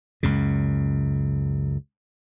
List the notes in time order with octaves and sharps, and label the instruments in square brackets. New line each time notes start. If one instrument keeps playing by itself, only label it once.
[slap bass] C#2 F#2 C#3